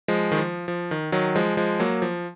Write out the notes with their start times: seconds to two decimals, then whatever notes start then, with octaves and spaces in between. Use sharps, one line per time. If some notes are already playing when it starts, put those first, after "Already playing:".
0.08 F3 G#3
0.32 D#3
0.38 F3
0.68 F3
0.91 D#3
1.12 D#3 F#3
1.35 F3 G#3
1.57 F3 G#3
1.80 F#3 A#3
2.02 F3